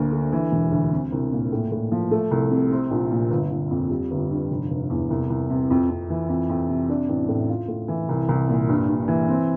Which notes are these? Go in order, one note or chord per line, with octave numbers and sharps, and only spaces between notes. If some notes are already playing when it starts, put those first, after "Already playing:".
Already playing: D2 D3 A#3
D3
E3
E1
D2
C4
C2
A#2
A2
A2
F3
A3
C2
C3
C4
A#1
A#2
G1
G1
F2
G3
G1
G2
F1
F1
E2
C2
C2
C3
F2
F2
E3
F2
F2
C3
D4
A1
A2
F4
A2
E3
C2
C2
A#2
G2
G2
E3
C4